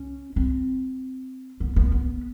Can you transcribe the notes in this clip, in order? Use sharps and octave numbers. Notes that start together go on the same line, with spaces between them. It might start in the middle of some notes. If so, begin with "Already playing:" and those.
Already playing: C#4
C4
B3
B3
B3